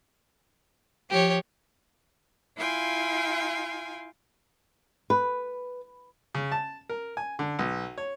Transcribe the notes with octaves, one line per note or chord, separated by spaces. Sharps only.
F3 G4 C#5
E4 F4 F5 G5 G#5 C6
B4
C#3
A5
A#4
G#5
D3
B1
C#5